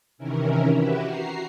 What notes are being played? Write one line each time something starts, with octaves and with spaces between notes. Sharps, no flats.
C3 D#3 E3 C#4 E4 A#4
E4 F#4 G4 B4 E5
F#4 A#5 C7